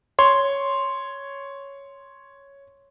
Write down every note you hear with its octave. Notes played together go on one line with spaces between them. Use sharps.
C#5 C6